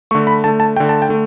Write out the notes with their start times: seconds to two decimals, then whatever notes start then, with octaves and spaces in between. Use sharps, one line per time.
0.11 D3 A3 C#6
0.27 B5
0.44 D3 A3 A5
0.60 A5
0.77 D3 A3 G5
0.89 A5
1.02 G5
1.09 D3 A3